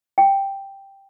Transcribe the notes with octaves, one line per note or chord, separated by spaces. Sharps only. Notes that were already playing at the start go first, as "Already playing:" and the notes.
G5